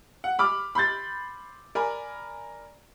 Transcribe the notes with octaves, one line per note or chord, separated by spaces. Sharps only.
F#5
B5 D6 F6
B5 C6 G6 A6
A#4 D5 G#5 B5